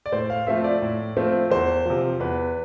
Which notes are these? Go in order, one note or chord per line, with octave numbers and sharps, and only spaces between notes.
D5
A2 C5
F5
F3 A3 C4 F4 E5
D5
A2
F3 A3 C4 F4
E2 C5
C3 F3
E2 B4